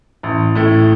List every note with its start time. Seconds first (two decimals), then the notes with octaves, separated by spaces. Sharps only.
0.23 A1
0.55 A2 A3